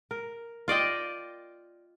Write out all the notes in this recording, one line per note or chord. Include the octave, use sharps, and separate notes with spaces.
A#4
F4 D5 D#5 G5